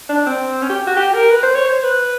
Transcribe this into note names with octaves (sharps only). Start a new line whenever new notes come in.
D4
C4
C#4
G4
F#4
G4
A#4
B4
C5
C#5
C5
B4